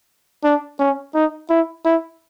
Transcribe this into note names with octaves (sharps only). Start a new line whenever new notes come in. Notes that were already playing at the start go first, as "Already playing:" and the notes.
D4
C#4
D#4
E4
E4